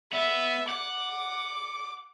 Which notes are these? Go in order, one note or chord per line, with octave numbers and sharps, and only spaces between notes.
B3 E5
F#5 D6